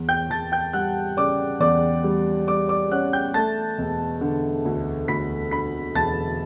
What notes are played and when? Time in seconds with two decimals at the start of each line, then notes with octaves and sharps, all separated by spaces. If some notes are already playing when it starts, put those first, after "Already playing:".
Already playing: E2
0.09 G5 G6
0.30 E2 A5 A6
0.52 G5 G6
0.73 G3 F#5 F#6
1.17 C#3 D5 D6
1.60 E2 D5 D6
2.04 G3
2.47 G3 D5 D6
2.69 D5 D6
2.91 C#4 F#5 F#6
3.13 G5 G6
3.34 A3 A5 A6
3.78 E1
4.21 D3
4.65 D2
5.08 D2 B5 B6
5.51 D3 B5 B6
5.95 E1 A5 A6